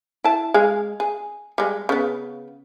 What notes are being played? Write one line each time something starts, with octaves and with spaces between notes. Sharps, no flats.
E4 A5
G#3 G#4 F5
G#4
G3 G#3
C#3 B3